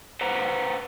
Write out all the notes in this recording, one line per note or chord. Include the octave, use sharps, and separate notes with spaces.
B4 C5 F#5 A#5